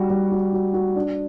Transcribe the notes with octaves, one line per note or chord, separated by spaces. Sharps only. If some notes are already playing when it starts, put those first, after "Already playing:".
Already playing: G3 F#4
G3
F#4
F#4
F#4
D4